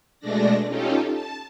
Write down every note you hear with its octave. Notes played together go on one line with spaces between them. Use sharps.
B2 G#3 A3 D4 D5 A#6
C#4 D#4 F4 G4 A4
A5